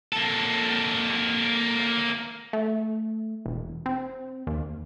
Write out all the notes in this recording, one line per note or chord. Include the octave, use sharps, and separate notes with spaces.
A#3 A4
A3
E1
C4
D#2